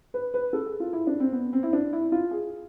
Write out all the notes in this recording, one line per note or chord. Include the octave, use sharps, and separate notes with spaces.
B4
B4
A4
G#4
F4
E4
D4
C4
B3
C4
E4
D4
E4
F4
G#4